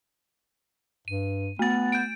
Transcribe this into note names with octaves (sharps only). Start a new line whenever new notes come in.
G2 D#7
A3 B3 A6
G6 D7